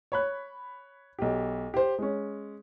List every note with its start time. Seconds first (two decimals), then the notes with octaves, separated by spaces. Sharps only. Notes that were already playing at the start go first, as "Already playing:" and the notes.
0.12 C#5 B5 F#6
1.19 B1 G4
1.74 G4 C5
1.99 G#3 C#4